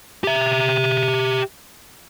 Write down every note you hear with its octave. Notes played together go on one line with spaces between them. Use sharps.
G4 E5